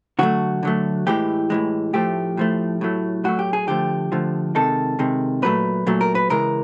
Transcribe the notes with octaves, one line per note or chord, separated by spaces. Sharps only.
D3 F#3 A3 F#4
D3 F#3 A3
A2 E3 G#3 G4
A2 E3 G#3
A2 F3 A3 G4
A2 F3 A3
A2 F#3 A3
A2 F#3 A3 F#4
G4
G#4
D3 F3 A3 G4
D3 F3 A3
C3 D#3 G#3 A4
C3 D#3 G#3
A#2 F#3 A3 B4
A#2 F#3 A3
A#4
B4
C#3 E3 G#3 A#4